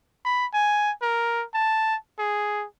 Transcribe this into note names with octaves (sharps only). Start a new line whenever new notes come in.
B5
G#5
A#4
A5
G#4